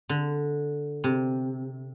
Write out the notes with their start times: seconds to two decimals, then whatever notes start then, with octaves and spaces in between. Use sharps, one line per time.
0.09 D3
1.04 C3